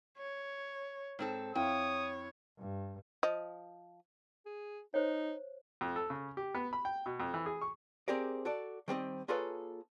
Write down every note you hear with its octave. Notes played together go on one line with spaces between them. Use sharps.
C#5
G#2 C4 A4
F2 E4 C#5 F5 G5 D#6
G2
F3 D#5
G#4
D#4 C5 C#5
F2
A4
C#3
G4
B3
B5
G5
B2
F2
E3
G#4
C#6
C4 G4 G#4 A#4 D5
F#4 A4 D5
D#3 G3 C4 D#5
A#3 F4 G#4 A4 B4 C#5